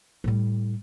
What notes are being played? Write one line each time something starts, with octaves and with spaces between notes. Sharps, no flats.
A2 G3